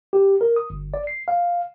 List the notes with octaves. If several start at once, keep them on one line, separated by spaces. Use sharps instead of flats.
G4
A#4
D#6
G1
D5
C7
F5